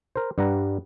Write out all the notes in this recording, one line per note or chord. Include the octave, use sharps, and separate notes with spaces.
A#4 C5
G2 G3 F#5 A#5